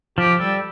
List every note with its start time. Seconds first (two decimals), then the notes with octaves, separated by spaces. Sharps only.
0.18 F3 G4
0.40 G3 A4